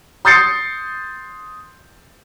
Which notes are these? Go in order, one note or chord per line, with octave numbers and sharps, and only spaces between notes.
C6 D#6 G6 A6 C7 C#7